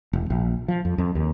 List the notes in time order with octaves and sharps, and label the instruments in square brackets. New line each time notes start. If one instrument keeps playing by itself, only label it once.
[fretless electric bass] E1
A#1
F3
F2
F2
D#2